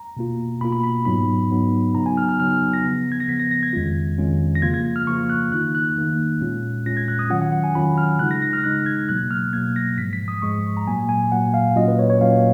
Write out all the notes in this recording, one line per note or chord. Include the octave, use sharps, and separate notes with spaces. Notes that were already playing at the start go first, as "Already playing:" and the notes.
Already playing: A#5
B2 A#3 F4
B2 A#3 F4 B5
B5
B5
G#2 F#3 B3 D#4 B5
G#2 F#3 B3 D#4
C#3 F#3 B3 D#4 A#5
G#5
F6
F6
C#3 F#3 B3 D#4 F6
F6
A#6
C#3 F3 B3
G#6
A#6
C#3 F3 B3 B6
A#6
A#6
G#6
F2 D#3 G#3 C#4 F4
F2 D#3 G#3 C#4 F4
A#6
C#3 F3 A#3 F4 G#6
G#6
F6
C#3 F3 A#3 F4 C#6
F#6
D#3 A#3 D#4 F#6
F#6
D#3 A#3 D#4
A#2 G#3 C#4 F4
A#2 G#3 C#4 F4 A#6
G#6
F#6
D#6
D#3 F#3 C#4 F4 F#5
F#5
F#5
G#5
D#3 F#3 C#4 F4 B5
F6
C#3 G#3 D#4 F#6
A#6
A#6
F6
C#3 G#3 D#4 F#6
G#6
B2 F#3 A#3 F#6
F6
B2 F#3 A#3 G#6
A#6
G#2 F3 G#3 B6
B6
D#6
G#2 F3 G#3 C#6
A#5
A#2 F#3 A#3 G#5
G#5
A#2 F#3 A#3 F#5
F5
A#2 F#3 A#3 C#4 F4 D#5
B4
C#5
C#5
A#2 F#3 A#3 C#4 F4 F5